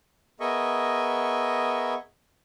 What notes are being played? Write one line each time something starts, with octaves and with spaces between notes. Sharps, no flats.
B3 G#4 A#4 D#5 E5 C#6